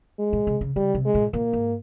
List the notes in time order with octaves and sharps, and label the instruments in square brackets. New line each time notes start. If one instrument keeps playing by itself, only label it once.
[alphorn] G#3
[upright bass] A#2
C3
C#3
[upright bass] C#3 [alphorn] G3
[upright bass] C3
[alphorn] G#3
[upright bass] A#2
[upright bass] A#2 [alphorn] A#3
[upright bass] G#2